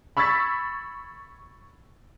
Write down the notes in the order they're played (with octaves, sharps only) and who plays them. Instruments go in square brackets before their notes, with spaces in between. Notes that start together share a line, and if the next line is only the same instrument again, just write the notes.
[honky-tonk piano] B5 C#6 E6 G#6 A6 B6